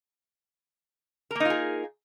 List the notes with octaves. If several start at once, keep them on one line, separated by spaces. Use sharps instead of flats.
A#3 D#4 F4 G#4 A#4